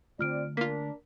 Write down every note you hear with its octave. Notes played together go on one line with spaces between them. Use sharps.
D3 A3 C4 F4 D5 F6 D7
A#3 D4 F4 A#4 B6